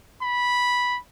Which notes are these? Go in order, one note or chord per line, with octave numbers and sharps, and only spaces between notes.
B5